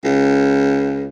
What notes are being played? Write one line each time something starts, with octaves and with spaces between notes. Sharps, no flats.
C#2